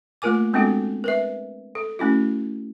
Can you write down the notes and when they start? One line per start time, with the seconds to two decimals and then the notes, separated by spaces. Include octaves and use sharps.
0.22 A3 A#3 F4 A#4 G#5 D6
0.54 G#3 B3 C4 D4 F#4 A4
1.04 A#4 B4 E5
1.75 A4
1.99 A3 C#4 E4 F#4